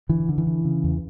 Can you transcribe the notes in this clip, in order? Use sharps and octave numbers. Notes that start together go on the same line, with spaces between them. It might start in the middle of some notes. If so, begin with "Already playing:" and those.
D3 E3
D3
E3
D3
C#3
E2